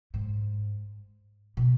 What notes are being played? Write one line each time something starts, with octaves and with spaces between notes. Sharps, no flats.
G#2
B2